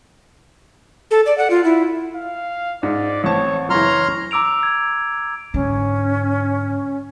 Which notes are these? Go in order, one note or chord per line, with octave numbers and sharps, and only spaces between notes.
A4
D5
F#5
F4
E4
F5
G#2 D5
A1 C4 C#5 A5
F#1 E3 C#5 A#5 C6 F6
A#5 D6 E6 D7 F7
G#6
G#2 D3 C#4